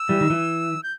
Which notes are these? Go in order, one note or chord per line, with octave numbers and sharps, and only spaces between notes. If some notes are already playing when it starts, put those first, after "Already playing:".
Already playing: E6
E3 G3
D#3
E3
G6